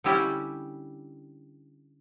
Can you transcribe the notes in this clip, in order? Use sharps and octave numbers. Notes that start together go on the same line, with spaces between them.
D3 G3 C#4 E4 G4